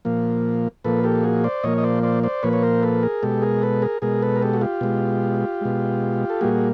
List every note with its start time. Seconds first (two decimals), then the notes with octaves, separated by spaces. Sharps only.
0.05 A#2 F3 A#3
0.84 A#2 F3 A#3 A4 B4
1.04 G4 A4
1.23 F#4 G#4
1.44 C5 D5
1.63 A#2 F3 A#3 C#5 D#5
1.78 D#5
1.83 C5 D5
2.03 C5 D5
2.23 C5 D5
2.43 A#2 F3 A#3 B4 C#5
2.53 C#5
2.63 A#4 C5
2.82 A4 B4
3.03 G#4 A#4
3.23 B2 G#3 G4 A4
3.42 G#4 A#4
3.62 A4 B4
3.82 G#4 A#4
4.02 B2 G#3 G#4 A#4
4.22 A4 B4
4.36 A#4
4.41 G4 A4
4.54 F#4
4.61 F4 G4
4.81 B2 G#3
5.61 B2 G#3
6.30 A4
6.41 A#2 G3 A#3 F#4 G#4